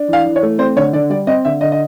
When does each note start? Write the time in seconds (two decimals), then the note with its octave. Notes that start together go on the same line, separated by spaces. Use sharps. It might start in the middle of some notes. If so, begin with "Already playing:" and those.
Already playing: D4
0.08 E3 F5
0.26 E3
0.36 C#5
0.43 A3
0.59 C4 C5
0.76 D3 C#5
0.93 D3 D5
1.10 G3 D5
1.27 C4 D#5
1.45 D3 E5
1.61 D3 D#5
1.72 D#5